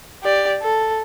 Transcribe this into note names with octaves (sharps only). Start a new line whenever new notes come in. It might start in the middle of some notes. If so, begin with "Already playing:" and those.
G4 D5
A4